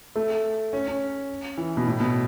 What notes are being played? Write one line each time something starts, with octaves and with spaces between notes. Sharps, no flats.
A3
C#4
C#4
E3
B2
A2
B2